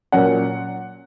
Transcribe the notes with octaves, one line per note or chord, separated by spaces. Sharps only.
A#2 F#3 C#4 F#5